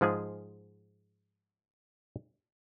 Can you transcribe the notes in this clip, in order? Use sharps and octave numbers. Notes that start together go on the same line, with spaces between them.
G#2 F3 G#3 G#4